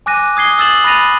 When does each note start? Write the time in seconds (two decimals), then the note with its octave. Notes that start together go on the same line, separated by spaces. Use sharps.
0.06 G#5 D6 F#6 A#6 D#7
0.37 D#6 G#6 C7 G7
0.58 D#6 E6 G#6 A6 E7 F#7
0.84 B5 F#6 A6 A#6 D#7 F7